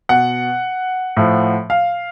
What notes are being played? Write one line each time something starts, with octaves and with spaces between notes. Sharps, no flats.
B2 F#5
A2 F3
F5